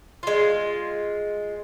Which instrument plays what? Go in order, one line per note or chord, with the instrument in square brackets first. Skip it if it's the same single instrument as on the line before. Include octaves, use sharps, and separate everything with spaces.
[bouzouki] G#3 F4